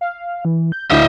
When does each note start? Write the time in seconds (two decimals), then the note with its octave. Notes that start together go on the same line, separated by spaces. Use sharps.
0.01 F5
0.45 E3
0.72 G6
0.91 D2 E4 F#4 D#5 E5 G6